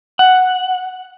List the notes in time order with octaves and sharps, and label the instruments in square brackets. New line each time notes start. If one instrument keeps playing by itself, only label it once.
[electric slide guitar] F#5